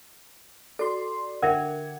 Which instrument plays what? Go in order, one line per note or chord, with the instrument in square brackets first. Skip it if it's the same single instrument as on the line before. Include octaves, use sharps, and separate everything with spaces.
[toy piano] F#4 A4 [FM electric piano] D5 C6
[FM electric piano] D3 G#6 [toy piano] A#4 E5 G5 [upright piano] F#5